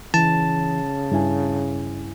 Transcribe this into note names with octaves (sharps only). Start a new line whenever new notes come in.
C#3 E3 A5
G2 E4 G#5